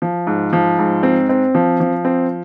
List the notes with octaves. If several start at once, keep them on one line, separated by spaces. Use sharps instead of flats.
F3
G#2
F3
G#2
C4
C4
F3
F3
C4